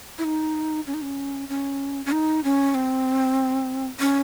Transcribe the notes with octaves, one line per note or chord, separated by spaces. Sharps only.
E4
D#4
C#4
D#4
C#4
C#4
C#4
D#4
C#4
C4
C#4